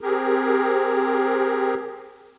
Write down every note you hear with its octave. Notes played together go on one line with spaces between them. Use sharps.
C4 G4 G#4 A#4